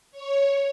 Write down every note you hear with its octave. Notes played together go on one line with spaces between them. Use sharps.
C#5